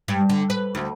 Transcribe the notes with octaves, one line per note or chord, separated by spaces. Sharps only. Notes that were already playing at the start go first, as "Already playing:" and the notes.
G2
D3
B4
D2